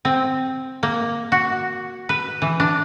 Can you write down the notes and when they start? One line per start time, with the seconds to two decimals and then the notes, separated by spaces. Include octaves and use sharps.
0.05 C4
0.83 A#3
1.32 F#4
2.09 B4
2.42 E3
2.60 D4